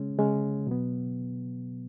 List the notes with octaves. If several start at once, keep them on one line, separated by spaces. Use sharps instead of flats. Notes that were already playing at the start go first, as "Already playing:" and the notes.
Already playing: C#3 G#3 C#4
C#3 G#3 C#4
B2 F#3 B3